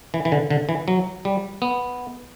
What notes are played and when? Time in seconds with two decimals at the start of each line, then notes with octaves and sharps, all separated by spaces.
0.14 E3
0.25 E3
0.32 D3
0.50 D3
0.69 E3
0.88 F#3
1.25 G3
1.62 B3